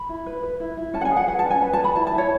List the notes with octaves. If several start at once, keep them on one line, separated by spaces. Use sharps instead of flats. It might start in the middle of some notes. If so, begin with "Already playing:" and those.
Already playing: B5
E4
B4
B4
E4
E4
C#4 A5
F#5
G#5
G#4
F#5
B4 F#5
A5
C#4
G#5
B4
A5
B4
B5
E4 A5
A5
E4
C#5